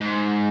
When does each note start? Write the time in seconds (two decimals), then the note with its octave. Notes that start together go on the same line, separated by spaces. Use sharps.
0.01 G#2